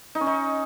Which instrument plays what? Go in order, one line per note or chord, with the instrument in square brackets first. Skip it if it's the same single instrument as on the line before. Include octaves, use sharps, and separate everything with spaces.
[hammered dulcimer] D#4
C#4
D#4